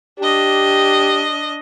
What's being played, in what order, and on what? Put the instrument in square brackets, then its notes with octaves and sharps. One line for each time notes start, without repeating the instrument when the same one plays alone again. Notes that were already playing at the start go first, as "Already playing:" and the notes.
[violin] D4 D#5 [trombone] G4